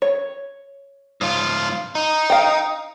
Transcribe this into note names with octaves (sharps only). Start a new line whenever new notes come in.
C#5
G#2 F4
D#4
F5 G5